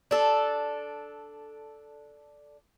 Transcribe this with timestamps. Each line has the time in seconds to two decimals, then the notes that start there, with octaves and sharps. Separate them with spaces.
0.11 D4 A4